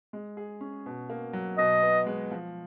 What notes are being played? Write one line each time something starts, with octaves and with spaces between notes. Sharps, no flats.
G#3
G#4
C#4
B2
A#3
F#3
B2 D#5
B3
G#3
F3